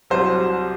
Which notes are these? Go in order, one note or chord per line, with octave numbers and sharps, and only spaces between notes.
C2 C3 F#3 C5